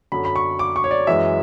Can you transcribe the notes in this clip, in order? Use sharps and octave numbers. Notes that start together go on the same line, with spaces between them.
F#2 D3 F#3 B5
B5
C#6
D6
C#6
C#5
D5
F#2 E3 G#3 E5